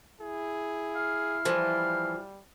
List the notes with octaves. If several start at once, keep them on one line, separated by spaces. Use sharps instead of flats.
E4 G#4
F5
E3 F3 G3